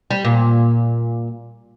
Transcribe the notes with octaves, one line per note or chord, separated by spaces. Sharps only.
G3
A#2